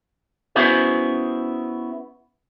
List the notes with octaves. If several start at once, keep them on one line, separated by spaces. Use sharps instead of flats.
B3 C#4 E4 F#4 G#4 C5